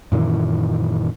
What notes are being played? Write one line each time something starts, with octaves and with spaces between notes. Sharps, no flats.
F#2 A#2 D#3 E3